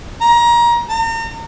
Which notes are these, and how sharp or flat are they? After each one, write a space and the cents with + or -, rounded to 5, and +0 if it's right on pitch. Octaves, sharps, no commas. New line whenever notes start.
A#5 +25
A#5 -40